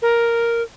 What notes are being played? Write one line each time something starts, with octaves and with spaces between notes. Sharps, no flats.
A#4